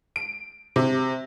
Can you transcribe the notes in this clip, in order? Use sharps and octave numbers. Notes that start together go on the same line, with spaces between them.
D7
C3